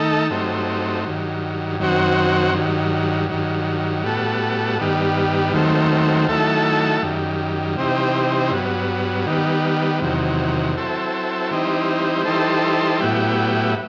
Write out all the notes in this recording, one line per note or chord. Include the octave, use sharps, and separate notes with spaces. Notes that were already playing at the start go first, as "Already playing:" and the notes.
Already playing: D#3 A3 D#4 A4
G2 F#3 A3 C4 D#4
G2 D#3 F#3
F#2 D#3 F#3 C4 F#4
G2 D#3 F#3
G2 D#3 F#3
A2 G3 B3 F#4 A4
G2 D#3 G3 B3
D#2 D#3 F#3 A3 C4
D#3 F#3 A3 E4 A4
F#2 D#3 G3
C3 E3 G3 C4 D#4
G2 F#3 B3
D#3 G3 B3
E2 C3 D#3 F#3
F#3 C4 E4 A4
E3 G3 C4 D#4
E3 G3 D#4 A4 C5
A2 F#3 B3 E4 G4